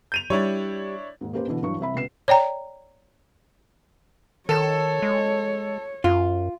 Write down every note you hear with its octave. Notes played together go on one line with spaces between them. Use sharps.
G6 D#7 F7
G3 D4 E4 C#5
D#2 G#2
A#3 C#4 G4 B4 C5
B2 D3 E3
G2 E3 F#3 C#6
C2 C4 E5 B5
C#2 B2 B4 C7 E7
C#5 D5 G5 A#5
D#3 A4 C#5 E7
G#3
F#2 F4